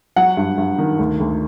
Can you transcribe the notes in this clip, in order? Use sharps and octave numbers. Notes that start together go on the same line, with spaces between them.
F#3 F#5
G2
G2
D#3
D2
D2